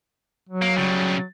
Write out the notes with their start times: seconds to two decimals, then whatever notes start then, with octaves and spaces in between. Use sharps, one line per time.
0.49 F#3
0.62 A#3
0.77 C#3 G3